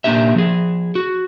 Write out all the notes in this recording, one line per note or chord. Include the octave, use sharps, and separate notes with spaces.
A#2 A#3 D4 G4 E5
F3 G#4
F#4